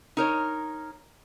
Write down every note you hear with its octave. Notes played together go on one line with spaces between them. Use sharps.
D#4 A#4 C#5